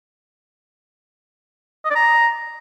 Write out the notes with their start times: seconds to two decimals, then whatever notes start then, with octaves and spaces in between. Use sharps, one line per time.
1.85 D#5
1.90 D5
1.95 A#5